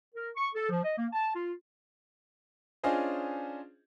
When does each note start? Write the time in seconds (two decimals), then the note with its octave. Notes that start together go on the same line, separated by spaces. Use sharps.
0.15 A#4
0.36 C#6
0.54 A4
0.70 F3
0.84 D#5
0.98 A#3
1.13 A5
1.35 F4
2.83 C#4 D4 F4 G#4 C5 D#5